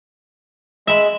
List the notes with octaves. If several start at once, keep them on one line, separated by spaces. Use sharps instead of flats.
G#3 E5 B5